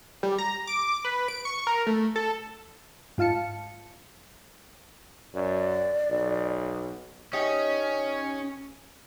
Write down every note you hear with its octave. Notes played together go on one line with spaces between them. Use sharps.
G3
A#5
D6
B4
D7
C#6
A#4
A3
A4
G#2 F4 F5 A5 C#7
F#2 D5
B1
C#4 D#4 G4